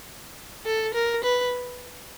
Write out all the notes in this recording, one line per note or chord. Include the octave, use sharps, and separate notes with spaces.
A4
A#4
B4